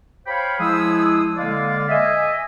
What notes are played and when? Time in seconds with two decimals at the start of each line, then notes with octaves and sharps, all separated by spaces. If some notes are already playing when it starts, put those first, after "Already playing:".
0.27 C5 C#5 F5 G5 B5
0.59 F3 G#3 E4 G#4 D#6 E6
1.37 D3 G#3 A#3 D5 F5
1.89 D#5 E5 G#5